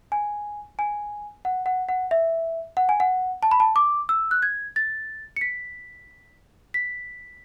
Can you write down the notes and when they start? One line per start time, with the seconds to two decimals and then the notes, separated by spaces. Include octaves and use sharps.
0.12 G#5
0.79 G#5
1.45 F#5
1.66 F#5
1.89 F#5
2.11 E5
2.77 F#5
2.89 G#5
3.00 F#5
3.43 A5
3.51 B5
3.60 A5
3.76 D6
4.09 E6
4.31 F#6
4.43 G#6
4.76 A6
5.37 C#7
5.41 B6
6.74 B6